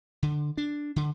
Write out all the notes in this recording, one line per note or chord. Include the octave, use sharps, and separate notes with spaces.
D3
D4
D3